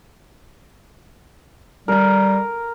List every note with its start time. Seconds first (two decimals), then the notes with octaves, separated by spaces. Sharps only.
1.88 G3 A#4 A#5